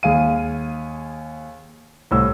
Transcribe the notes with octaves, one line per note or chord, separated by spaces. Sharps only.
D#2 G#4 F5 D#7
C2 A2 E6